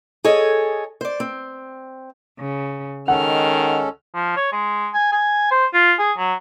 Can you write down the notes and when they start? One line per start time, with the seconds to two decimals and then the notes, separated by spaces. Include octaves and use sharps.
0.24 G#4 A4 C#5 D#5
1.01 C5 D5
1.20 C4
2.39 C#3
3.08 D#3 G#3 C#4 A4 F#5 F6
4.15 F3
4.36 C#5
4.52 G#3
4.94 G#5
5.12 G#5
5.51 C5
5.74 F4
5.99 G#4
6.18 F#3